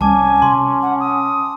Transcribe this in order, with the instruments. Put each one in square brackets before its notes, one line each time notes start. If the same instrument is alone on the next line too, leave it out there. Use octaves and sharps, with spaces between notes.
[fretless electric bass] C2 G3 [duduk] C#4 [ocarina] G#5 [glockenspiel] A5 D6
[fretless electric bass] C3 [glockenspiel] C6
[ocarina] F#5
D#6